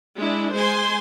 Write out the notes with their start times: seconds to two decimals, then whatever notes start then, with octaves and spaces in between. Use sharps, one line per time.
0.19 G#3 D4 E4
0.54 G#3 C5 G#5 C6